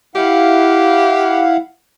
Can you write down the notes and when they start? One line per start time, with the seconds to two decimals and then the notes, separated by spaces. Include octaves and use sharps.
0.15 E4 G4 F5 F#5